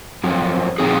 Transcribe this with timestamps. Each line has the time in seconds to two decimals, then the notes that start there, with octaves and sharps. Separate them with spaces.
0.24 F#2 F3 C4
0.78 A#2 F3 C4 D#4 G#4